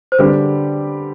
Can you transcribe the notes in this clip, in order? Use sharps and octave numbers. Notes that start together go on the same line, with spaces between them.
C5
D3 G3 D4 G4 B4